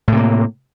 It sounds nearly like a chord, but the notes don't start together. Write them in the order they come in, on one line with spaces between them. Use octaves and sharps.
A2 C3 A#3